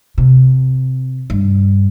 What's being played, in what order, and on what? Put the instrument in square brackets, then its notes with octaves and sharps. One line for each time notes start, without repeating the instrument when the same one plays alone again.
[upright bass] C3
G2